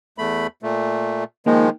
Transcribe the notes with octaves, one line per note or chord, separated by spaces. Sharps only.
E2 A3 B5
A#2 A3
D#3 F3 G#3 A#3 D#4 G5